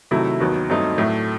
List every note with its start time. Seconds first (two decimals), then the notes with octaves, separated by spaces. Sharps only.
0.11 C3 D#3 F#3 A3 E4
0.40 D#2 D#3 F#3 B3 F#4
0.69 G2 F#3 A3 C4 D#4
0.98 A2 F#3 A3